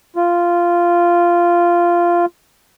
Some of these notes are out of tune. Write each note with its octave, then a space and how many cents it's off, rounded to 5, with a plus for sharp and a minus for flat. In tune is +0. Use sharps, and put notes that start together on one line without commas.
F4 -10